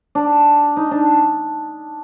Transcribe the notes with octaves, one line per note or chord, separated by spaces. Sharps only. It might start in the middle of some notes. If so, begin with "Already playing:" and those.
D4
D#4
D4